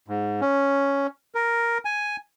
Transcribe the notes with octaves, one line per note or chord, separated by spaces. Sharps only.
G#2
C#4
A#4
G#5